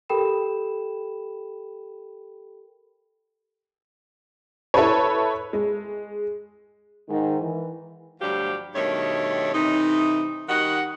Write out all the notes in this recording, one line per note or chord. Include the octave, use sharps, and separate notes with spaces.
G4 A4 A#4 G5 B5 E7
E4 A4 B4 C#5
G#3
G#2 D#3
E3
D2 G2 F3 F#3 G4 D5
G2 B2 D#3 A3 C#5
C3 E3 A3 D#4
D#3 G3 F#4 D#5 F#5